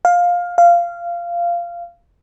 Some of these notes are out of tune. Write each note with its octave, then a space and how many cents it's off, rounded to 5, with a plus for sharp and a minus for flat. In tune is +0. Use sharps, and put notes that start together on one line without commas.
F5 +15
F5 -15